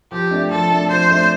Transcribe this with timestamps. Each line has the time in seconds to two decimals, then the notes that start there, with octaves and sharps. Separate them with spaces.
0.12 F3 G4
0.31 A3 D4
0.51 F3 A4
0.70 A3 D4
0.90 F3 C5
1.10 A3 D4